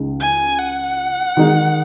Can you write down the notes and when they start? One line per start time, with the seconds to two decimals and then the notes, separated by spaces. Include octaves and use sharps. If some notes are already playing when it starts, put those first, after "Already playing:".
Already playing: C#2 C#3 G#3 D#4
0.20 G#5
0.59 F#5
1.37 D#3 G#3 D#4